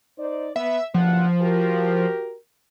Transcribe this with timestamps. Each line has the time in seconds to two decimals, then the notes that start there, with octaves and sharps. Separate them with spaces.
0.18 D#4 C5 D5
0.56 B3 E5
0.94 F#1 G2 F3 F#5
1.42 F#4 G4 A#4